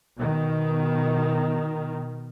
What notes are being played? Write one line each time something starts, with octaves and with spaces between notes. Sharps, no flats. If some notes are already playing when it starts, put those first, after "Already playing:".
B2 D#3